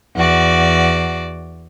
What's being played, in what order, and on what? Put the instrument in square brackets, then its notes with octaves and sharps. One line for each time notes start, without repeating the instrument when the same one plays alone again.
[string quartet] E2 F#4 D5